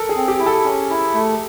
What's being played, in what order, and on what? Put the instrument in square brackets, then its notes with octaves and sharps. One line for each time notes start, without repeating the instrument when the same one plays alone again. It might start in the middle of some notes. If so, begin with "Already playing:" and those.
Already playing: [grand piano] A4 A#4
G#4
[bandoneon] C4
[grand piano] G4
[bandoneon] E4
[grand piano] A4
[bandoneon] C#4
E4
A3